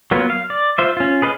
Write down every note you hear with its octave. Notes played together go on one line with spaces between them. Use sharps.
F#3 A#3 B3 F4
F5
D5
F4 C5 E5
C#4 F4
G#4 B4 D5 D#5 F5